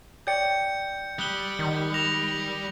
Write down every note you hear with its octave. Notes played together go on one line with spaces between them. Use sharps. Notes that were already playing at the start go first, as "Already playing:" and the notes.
C#5 D5 G5 G6 C#7
G3 D#6 F#6 G7
D#3
A#6 E7 F7